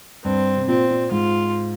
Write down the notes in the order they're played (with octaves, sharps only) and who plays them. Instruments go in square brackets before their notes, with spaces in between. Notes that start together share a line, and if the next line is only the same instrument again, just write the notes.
[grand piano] G2 [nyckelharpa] C4
[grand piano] C3
[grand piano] A#2 [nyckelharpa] C4
[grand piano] A#2
[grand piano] G#2 [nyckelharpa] F4